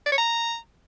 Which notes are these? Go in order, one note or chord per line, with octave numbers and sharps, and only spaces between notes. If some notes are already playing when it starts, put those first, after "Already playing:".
D5
C#5
A#5